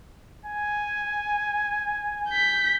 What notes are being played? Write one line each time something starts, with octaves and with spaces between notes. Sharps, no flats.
G#5
G6 B6